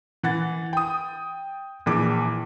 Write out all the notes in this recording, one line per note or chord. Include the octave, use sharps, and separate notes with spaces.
E3 F#5 A6
G5 D#6
A#1 E3 D6